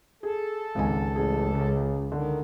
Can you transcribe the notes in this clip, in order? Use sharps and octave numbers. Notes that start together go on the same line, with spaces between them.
G#4 A4
G#1 C#2 D#5 G#5
A1 G#4
C#3
D3 D#3